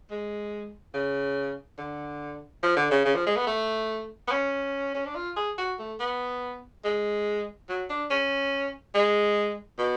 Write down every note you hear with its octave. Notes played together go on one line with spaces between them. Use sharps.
G#3
C#3
D3
F3
D3
C#3
C#3
F3
G#3
B3
A3
B3
C#4
C#4
D4
F4
G#4
F#4
A3
B3
G#3
F#3
D4
C#4
G#3
B2